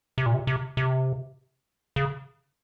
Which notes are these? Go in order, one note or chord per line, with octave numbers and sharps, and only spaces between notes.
C3
A#2
C3
C3
C3
C#3